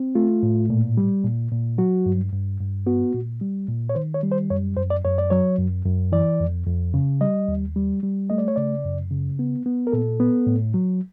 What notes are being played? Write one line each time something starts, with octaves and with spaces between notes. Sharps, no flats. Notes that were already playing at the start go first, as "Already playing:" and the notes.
Already playing: C4
A3 F4
A2
A#2
G3
A#2
A#2
F#3 F#4
G2
G2
G2
B3 F#4
A#2
G3
A#2
C#5
D#3 C5
C#5
G3
C5
F#2 C#5
F#2 C5
D5
F#2 C#5
D5
F#3 C#5
F#2
F#2
E3 D5
F2
F2
C#3
G3 D#5
D#2
G3
G3
A3 D#5
D5
C#5
C#3 D5
F#2
C#3
B3
B3
A#4
A#2 A4
B3
A2
F#3